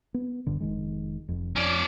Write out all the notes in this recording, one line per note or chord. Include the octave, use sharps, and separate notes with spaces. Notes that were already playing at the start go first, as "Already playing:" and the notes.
B3
D#1 G2 D3
F1 D#3 G#3
F1 F2
F2 C#4 D5